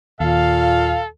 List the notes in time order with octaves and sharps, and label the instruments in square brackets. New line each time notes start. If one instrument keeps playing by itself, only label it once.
[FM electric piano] D#2 [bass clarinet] A#2 [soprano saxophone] A4 [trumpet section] F5